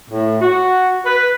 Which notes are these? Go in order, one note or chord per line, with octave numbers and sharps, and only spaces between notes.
A2
F#4
B4